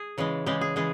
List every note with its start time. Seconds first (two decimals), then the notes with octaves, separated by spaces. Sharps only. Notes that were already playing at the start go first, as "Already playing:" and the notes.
Already playing: G#4
0.18 C#3 E3 G#3
0.46 C#3 E3 G#3 G4
0.61 G#4
0.76 C#3 E3 G#3 G#4